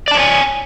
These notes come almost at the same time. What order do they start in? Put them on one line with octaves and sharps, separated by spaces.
D5 A5 C#5 G#5